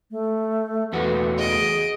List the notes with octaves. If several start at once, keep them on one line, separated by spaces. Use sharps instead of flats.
A3
E2 A3 F#4 B4
G#4 D#5 D7